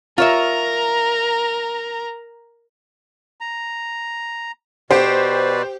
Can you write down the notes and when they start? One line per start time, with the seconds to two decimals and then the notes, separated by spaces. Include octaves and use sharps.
0.18 F4 A#4 C#5 E5 A#5
3.41 A#5
4.91 B2 G4 B4 C5 D5